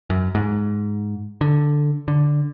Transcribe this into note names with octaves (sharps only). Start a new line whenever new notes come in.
F#2
G#2
D3
D3